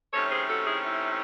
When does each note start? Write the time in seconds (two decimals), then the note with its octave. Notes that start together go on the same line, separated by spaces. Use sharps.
0.13 C3 D#3 A3 C#4 A4 C#5
0.30 G#4 C5
0.48 F#4 A4
0.66 E4 G#4
0.84 E4